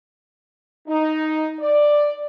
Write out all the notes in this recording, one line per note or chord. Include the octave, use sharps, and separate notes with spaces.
D#4
D5